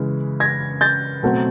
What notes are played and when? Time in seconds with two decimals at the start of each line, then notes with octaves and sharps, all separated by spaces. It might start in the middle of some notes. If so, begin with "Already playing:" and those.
Already playing: C#3 E3 G#3
0.40 G#6 A#6
0.81 G6 A6
1.23 B2 F#3 A3 C4